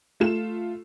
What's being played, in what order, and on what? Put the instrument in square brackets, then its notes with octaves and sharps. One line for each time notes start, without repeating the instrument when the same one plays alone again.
[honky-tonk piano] A3 F4 E7